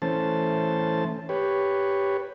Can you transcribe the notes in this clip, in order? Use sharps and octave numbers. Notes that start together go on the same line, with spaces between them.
E3 A3 C#4 C5 A5
G4 B4 C#5